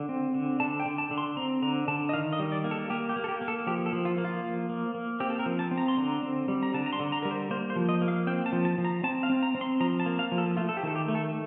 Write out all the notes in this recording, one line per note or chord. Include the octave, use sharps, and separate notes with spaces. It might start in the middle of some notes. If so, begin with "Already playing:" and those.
Already playing: D3
C4
D3
D3 A5
G5
D3
A5
D3
C6
C4 A#5
D3 A#5
D3 A5
D#5
D#3 F5
D#5
G3
D5
A#3
A4
A#3 G4
G4
A#3
A4
G4
A#3
A4
F3 G4
A4
F3
F4
A#3
F4
F3
A#3
A#3
C4 G4
A4
A#4
F3
A5
C4
A#5
C6
D3 A#5
C4
G3
A#5
D3 A5
A#5
C6
D3
A#5
G3 A#4
C5
A#3 C5
C5
F3
D#5
A#3
F5
C4 G5
A5
F3
A5
F3
A#5
C4 A5
F5
C4
A#5
C4
C6
F3 A#5
A5
A#3
F5
F3
A4
A3 F4
A4
G4
D#3 A4
G4
A3
A4